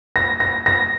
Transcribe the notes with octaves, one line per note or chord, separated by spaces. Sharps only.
A#6
A#6
A#6